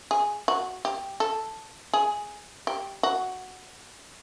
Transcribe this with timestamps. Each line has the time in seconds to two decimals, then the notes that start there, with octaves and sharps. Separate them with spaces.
0.11 G#4
0.48 F#4
0.85 G4
1.20 A4
1.93 G#4
2.67 G4
3.03 F#4